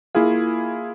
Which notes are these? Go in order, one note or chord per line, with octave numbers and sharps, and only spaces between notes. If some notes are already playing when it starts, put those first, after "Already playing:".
A#3 E4 F4 G#4 F5